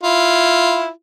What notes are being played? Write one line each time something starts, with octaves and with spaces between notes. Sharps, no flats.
E4 F4